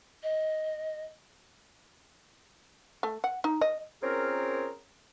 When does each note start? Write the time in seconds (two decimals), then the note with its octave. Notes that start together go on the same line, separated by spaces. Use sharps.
0.23 D#5
3.03 A3
3.24 F#5
3.44 D#4
3.61 D#5
4.03 C4 C#4 F4 G#4 A#4